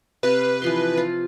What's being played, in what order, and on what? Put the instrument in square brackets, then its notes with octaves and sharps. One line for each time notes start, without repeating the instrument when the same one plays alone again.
[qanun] C3 F5 [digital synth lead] B4
[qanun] E3 F3 C6
F4